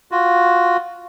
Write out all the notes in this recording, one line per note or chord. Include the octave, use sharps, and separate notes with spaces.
F4 F#4